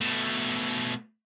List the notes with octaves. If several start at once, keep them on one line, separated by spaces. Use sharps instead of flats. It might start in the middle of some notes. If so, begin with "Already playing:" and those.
B2 A3